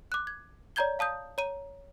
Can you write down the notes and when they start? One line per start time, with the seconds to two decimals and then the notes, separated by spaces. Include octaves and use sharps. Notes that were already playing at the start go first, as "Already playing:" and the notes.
0.12 D6 F#6
0.27 G#6
0.76 C#5 D5 A#5 G6 G#6 G7
0.99 F5 A5 D#6 G6
1.38 C#5 A#5 D#7